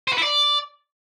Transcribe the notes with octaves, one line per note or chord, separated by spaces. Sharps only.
C5
B4
E4
D5